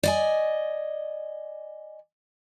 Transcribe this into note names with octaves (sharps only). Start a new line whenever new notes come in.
D5 D#5 G#5